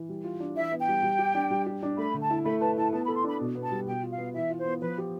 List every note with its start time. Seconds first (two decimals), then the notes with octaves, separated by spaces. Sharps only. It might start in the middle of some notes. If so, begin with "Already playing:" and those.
Already playing: E3
0.09 G3
0.24 F4
0.40 D4
0.56 E3 E5
0.72 B3
0.80 G5
0.88 G3
1.03 G3
1.19 G4
1.35 D4
1.51 G3
1.66 G4
1.83 D4
1.98 A3 B5
2.14 D3
2.22 A5
2.30 E4
2.45 A3 B5
2.61 B4 A5
2.77 E4 A5
2.93 B3 A5
3.05 A4 B5
3.16 C6
3.24 D4 B5
3.40 B2
3.55 B3
3.64 A5
3.72 G3
3.87 B2 G5
4.02 F4
4.11 F5
4.18 B3
4.34 E3 E5
4.50 F4
4.59 C5
4.66 B3
4.82 F3 B4
4.98 G4